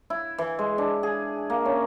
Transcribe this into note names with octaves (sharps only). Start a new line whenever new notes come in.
E4
E3
G#3
D4
G#4
A#3
C#4